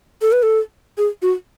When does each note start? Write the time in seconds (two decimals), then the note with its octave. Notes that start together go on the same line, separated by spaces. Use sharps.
0.22 A4
0.32 B4
0.43 A4
0.98 G#4
1.22 F#4